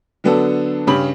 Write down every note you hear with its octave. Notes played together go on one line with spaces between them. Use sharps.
D3 F#3 B3 D4 A4
G2 C#3 C#4 G4 B5 F#7